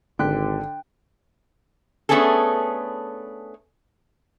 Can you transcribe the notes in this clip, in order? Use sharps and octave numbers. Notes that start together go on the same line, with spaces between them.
G#1 D3 G5 F#6 B6
A3 B3 C#4 D4 G#4 A4